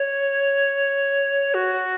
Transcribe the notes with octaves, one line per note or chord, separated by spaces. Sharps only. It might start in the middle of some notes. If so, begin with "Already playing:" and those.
Already playing: C#5
F#4